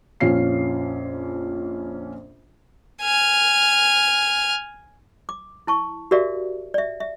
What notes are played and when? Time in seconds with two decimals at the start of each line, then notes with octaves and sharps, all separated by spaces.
0.20 A#1 F2 C#4 F4 C7
3.02 G#5 F6
5.29 D6
5.67 E4 A5 C#6
6.11 F#4 G4 A#4 D5 E5 F5
6.74 D5 E5
7.00 E5